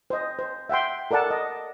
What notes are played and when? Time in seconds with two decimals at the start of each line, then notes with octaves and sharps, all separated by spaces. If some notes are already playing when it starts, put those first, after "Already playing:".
0.10 C5 D#5
0.39 C5
0.69 E5 F#5 G5 C6
1.11 A4 A#4 D5 F#5 A5
1.31 D#5